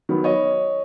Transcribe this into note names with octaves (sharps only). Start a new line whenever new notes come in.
D#3 F#3 B3
C#5 D#5